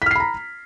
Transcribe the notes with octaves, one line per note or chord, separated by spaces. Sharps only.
A#5 B5 F6 B6 C7